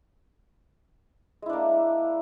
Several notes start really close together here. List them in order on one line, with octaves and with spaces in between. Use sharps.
G#3 E4 D4 A#3